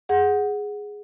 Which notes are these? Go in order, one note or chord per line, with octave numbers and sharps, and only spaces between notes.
G#4 F#5